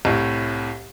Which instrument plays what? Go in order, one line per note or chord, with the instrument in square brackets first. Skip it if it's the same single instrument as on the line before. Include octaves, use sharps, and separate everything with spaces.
[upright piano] C2 A2